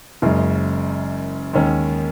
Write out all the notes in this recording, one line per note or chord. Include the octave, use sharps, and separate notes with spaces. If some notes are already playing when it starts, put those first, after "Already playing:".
F#1 F#2 C#3 G#3
D#2 D#3 G#3 C#4